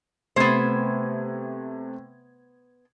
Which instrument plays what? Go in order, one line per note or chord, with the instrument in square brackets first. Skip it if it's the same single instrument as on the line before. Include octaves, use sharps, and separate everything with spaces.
[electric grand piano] C3 A3 G#6 [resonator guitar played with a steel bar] B3 C5